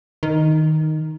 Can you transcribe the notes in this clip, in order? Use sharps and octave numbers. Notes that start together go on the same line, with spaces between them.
D#3